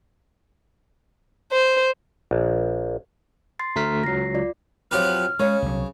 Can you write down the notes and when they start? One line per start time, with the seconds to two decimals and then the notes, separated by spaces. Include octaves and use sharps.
1.53 C5
2.31 A#1
3.59 C6 A6 C7
3.76 D2 A3 A#5 F6 B6
4.04 C#2 F#3 A#6 C7
4.35 F4 D5
4.91 F2 F3 F#3 G4 B4 F6
5.40 C#3 G#3 C#5
5.62 C2 F#3